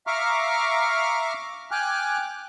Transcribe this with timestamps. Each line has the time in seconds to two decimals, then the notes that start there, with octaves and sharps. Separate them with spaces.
0.07 E5 F5 A#5 C#6 D6 F6
1.71 G5 G#5 D6 F6 F#6